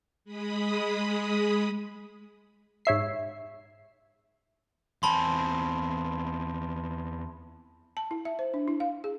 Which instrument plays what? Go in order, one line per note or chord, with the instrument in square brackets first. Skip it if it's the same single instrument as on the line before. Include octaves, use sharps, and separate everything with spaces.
[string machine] G#3 B5 D#6
[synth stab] G#2 C#5 E5 C7
[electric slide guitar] E2 C4 G#5 [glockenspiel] A5 B5 C6
[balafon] A5
E4
E5
C5
D4
E4
F5
G#4